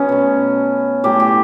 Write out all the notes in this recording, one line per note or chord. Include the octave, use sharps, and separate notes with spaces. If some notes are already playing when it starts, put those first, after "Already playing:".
Already playing: F#3 B3 C#4
B2 A3
A2 F#3 A3 G4
G4